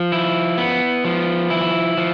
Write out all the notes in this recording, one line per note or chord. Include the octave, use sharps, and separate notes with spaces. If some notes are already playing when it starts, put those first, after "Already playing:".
Already playing: F3
E4
B3
F3
E4
F3